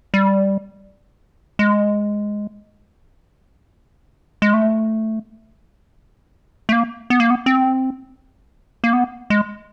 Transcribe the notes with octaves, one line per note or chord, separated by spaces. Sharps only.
G3
G#3
G#3
A3
A3
A#3
B3
A#3
B3
C4
A#3
B3
G#3